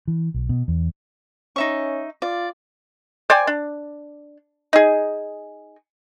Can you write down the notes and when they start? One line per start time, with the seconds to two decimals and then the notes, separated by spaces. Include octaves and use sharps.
0.08 E3
0.34 B1
0.49 B2
0.68 E2
1.56 C#4 D#4 E5 C#6
2.22 F4 D5
3.30 C5 D5 G5 G#5
3.47 D4
4.73 D#4 G#4